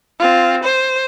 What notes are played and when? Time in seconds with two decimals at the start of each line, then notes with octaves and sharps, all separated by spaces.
0.19 C4 F4
0.63 C5